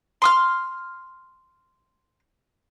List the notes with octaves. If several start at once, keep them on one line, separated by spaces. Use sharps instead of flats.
C6 D#6 F6